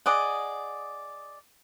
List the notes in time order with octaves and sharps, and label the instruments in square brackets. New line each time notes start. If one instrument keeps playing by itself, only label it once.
[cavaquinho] G#4 D5 D#5 F#5